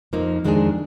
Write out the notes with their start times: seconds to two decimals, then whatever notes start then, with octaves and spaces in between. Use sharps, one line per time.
0.13 F2 F3 A#3 D#4
0.44 F2 D#3 G#3 D4 G#4